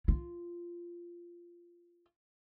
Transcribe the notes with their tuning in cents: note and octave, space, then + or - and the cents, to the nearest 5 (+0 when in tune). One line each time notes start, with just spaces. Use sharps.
F4 -10